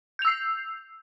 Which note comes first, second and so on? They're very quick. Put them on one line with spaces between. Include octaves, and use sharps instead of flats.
G6 F7 E6 C7